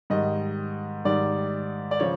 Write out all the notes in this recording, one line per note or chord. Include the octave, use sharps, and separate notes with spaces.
G#2 D#3 G3 D#5
G#2 D#3 G3 D5
D5
C#3 F3 C#5